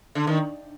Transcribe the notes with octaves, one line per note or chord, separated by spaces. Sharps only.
D3
D#3